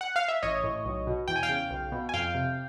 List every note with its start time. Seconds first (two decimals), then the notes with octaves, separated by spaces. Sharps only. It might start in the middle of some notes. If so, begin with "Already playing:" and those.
0.01 F#5
0.16 F5
0.28 E5
0.42 A1 C#5 D#5
0.64 A2
0.85 B1
1.07 B2
1.28 E2 G5
1.36 G#5
1.43 F5 G5
1.49 C#3
1.71 B1
1.92 B2
2.09 G#5
2.14 F2 F5 G5
2.35 C3